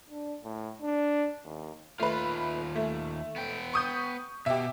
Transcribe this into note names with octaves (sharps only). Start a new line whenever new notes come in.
D4
A2
D4
D#2
D#2 A3 F4 B4
A3
B3 G5
C#6 D#6 G6
B2 G4 E5